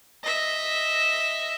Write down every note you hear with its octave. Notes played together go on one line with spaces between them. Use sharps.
D#5 E5